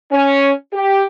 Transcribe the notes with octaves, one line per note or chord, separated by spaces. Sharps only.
C#4
G4